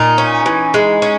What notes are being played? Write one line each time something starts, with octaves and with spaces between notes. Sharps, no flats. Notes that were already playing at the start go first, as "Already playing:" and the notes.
Already playing: A#2 D#4
C#4
E3
G#3
C#4